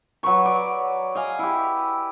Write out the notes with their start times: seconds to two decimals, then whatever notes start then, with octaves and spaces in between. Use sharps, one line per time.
0.23 F#3 B4 C#6
0.45 D5
1.15 D#5 F5 G#5
1.39 E4 G4